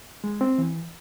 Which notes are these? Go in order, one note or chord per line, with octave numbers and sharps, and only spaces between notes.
G#3
C4
E3